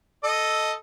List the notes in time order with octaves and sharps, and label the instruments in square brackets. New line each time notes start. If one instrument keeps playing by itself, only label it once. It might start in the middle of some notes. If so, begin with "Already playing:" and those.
[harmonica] A4 D#5